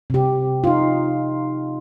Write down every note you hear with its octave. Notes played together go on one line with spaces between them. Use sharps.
C3 G4
D#4 F4